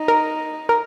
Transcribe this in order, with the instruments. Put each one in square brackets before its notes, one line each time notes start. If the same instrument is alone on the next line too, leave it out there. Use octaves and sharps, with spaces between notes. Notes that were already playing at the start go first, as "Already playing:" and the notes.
Already playing: [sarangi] D#4
[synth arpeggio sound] A#4
A#4